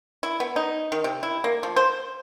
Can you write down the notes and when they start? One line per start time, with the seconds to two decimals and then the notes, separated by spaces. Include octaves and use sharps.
0.23 E4
0.40 B3
0.56 D#4
0.92 D#3
1.04 C3
1.23 E4
1.44 A#3
1.63 F3
1.76 C5